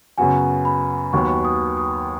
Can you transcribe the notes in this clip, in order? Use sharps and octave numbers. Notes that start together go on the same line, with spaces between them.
F#2 C#3 B3 F#4 G#5
B5
D#2 D#3 F#3 B3 C#6
D#6
D#6